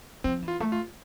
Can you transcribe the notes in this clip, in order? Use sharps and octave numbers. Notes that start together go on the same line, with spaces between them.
F3 C4
E3
F4
A3
F4